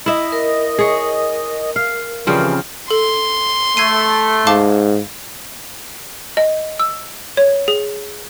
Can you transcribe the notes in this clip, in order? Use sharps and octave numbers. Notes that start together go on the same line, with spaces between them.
E4 D#5 E5
A#4
G#4 C#5
F5
C#3 E3 F3 G3 C4
A4 C6
A3 G#6 C7 D#7
G#2 F5 A5 D6
D#5
E6
C#5
G#4